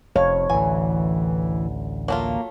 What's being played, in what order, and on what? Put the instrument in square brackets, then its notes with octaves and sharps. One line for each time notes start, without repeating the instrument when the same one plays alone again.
[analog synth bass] F1 [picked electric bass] F2 [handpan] C#5 [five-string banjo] F5
[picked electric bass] A1 D2 [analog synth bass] E3 [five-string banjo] G#5
[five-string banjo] F#3 A3 F4 [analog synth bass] A#3